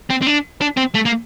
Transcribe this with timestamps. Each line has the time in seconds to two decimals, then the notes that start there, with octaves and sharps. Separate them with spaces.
0.10 C4
0.22 C4
0.27 D4
0.61 D4
0.77 C4
0.95 A3
1.06 A#3